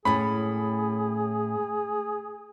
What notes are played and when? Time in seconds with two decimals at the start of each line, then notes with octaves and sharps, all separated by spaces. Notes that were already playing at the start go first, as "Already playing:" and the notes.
0.05 A2 A3 C#4 G#4 B5